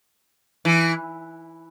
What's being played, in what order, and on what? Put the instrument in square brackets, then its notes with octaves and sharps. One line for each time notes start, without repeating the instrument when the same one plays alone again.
[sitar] E3